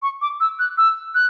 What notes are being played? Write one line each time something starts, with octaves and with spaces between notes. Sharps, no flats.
C#6
D6
E6
F#6
E6
F#6